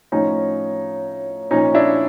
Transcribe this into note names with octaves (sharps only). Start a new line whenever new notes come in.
A2 F3 C#4 D#4
A#2 F3 C#4 D#4
D4 E4